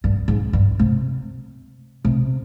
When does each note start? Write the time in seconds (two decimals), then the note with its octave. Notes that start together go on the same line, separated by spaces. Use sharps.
0.04 G2
0.28 G#2
0.53 G2
0.79 C3
2.05 C3